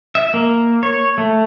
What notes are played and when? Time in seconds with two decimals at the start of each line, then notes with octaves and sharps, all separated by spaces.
0.15 E5
0.34 A#3
0.83 C#5
1.18 A3